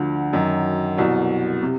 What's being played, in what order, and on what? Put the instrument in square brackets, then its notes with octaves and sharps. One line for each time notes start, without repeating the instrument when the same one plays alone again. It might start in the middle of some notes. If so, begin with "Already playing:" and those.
Already playing: [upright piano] D2 D3 F3
F#2 D#3 F#3
C2 B2 F#3
C3